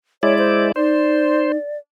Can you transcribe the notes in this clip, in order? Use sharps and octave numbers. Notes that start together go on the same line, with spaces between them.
G#3 E4 C#5 D5
C5
D#4 C5 D5